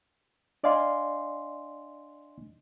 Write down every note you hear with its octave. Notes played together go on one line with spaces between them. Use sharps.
D4 D5 D#5 F5 G#5 C6